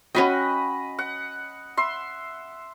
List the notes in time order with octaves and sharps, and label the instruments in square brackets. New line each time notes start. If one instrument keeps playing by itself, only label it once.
[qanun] C#4 F#4 G5 [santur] D#5 B5
[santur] F#5
E5 C6